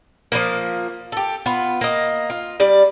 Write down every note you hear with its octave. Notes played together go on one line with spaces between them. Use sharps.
F3 G#3 A#3
G4 A4
B3 F4
A#3 D#5
F4
G3 D5